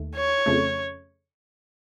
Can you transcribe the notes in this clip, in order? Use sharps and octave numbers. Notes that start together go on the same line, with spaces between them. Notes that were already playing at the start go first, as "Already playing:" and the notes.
Already playing: D#2 D#3 A3
C#5
F2 C#3 A3